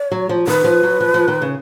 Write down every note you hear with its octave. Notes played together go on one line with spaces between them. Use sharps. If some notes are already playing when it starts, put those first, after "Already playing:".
Already playing: C#5
F#3
F3
D#3 B4
F3
F#3
F3
F3
D#3
C#3